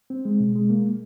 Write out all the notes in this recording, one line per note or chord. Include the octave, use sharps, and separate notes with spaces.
C4
G#3
B2
G#3
A#3